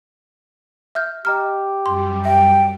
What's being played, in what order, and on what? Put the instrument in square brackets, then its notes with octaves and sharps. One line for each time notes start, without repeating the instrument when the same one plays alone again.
[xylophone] E5 F6 G6
[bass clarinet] G4 [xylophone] D#5 A#5 F6
[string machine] F#2 G3 [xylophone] C6
[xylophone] E5 [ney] G5